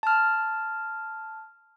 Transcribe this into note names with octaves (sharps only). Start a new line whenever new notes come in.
A5 F6